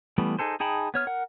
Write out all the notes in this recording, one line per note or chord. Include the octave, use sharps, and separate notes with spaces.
E3 G3 A3 B3
D#4 G#4 A4 C5
D#4 G#4 G5 A5 B5
B3 C#5 F6
A#4 F#5